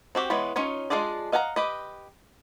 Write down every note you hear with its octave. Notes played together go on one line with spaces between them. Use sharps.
C4 F#4 G4
E3 G#3 B3 C#5 B5
C#4 D#4 F4 C#5
G#3 D4 F4 G#4 D5
D#5 F5 F#5 G#5 A#5
G4 B4 D#5